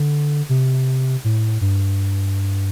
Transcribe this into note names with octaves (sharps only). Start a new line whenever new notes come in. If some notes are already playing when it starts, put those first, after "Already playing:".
Already playing: D3
C3
A2
G2